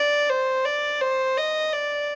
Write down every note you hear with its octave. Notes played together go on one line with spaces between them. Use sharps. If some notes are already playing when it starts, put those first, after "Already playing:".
Already playing: D5
C5
D5
C5
D#5
D5